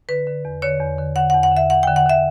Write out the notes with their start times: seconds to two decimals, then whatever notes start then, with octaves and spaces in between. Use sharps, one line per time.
0.09 D3 B4
0.27 D3
0.45 E2
0.62 D3 C#5
0.80 E2
0.98 D3
1.16 D3 F#5
1.30 E2 F#5
1.43 F#5
1.52 D3 E5
1.70 E2 F#5
1.83 D3 G5
1.96 F#5
2.06 D3 E5